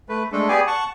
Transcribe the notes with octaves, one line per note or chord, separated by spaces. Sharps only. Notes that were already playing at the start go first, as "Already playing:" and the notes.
A3 B4
G#3 A3 D4 A4
B3 G4 G#4 D5 G#5
F#5 A5 C#6